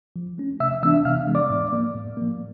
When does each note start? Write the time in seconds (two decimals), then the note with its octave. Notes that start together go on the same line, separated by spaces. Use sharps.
0.16 F3
0.38 A3 C#4
0.60 C3 E5 E6
0.83 E3 G#3 B3 D4 E5 E6
1.05 C3 F5 F6
1.27 E3 G#3 B3 D4
1.35 D5 D6
1.50 A2
1.72 F3 A#3
1.95 A2
2.17 F3 A#3